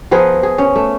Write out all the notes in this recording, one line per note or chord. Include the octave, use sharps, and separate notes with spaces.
F3 B3 G#4 A#4
G#4
C#4
A3